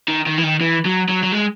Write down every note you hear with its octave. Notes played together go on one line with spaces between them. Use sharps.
D#3
D#3
E3
D#3
E3
F#3
F#3
F#3
G#3